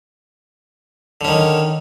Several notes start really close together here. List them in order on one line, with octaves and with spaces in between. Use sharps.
D3 C#4 D#3